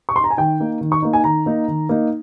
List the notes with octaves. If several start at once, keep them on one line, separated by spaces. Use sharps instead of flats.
C#6
C6
A#5
G#5
D#3 G5
A#3 D#4
D#3
C#6
A#3 D#4
G#5
D#3 A#5
A#3 D#4
D#3
A#3 D#4